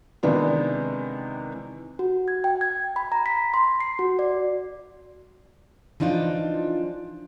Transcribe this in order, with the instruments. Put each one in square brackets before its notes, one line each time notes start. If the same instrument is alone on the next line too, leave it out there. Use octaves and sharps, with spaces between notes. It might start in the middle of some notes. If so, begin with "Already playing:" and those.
[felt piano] C3 D#3 E3 G#3 B3 D4
[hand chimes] F#4
G#6
G5
G#6
B5
A#5
B6
C6
C7
F#4
D5
[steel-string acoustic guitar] E3 F3 D4 D#4 F4